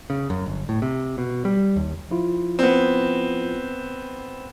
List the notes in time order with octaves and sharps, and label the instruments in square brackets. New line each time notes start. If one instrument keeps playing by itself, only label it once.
[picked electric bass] C#3
F#2
G1
A2
C3
B2
G3
D#2
[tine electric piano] F3 E4 F4
[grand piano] B3 C4